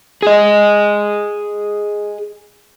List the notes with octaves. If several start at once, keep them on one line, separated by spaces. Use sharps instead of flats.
G#4 D#5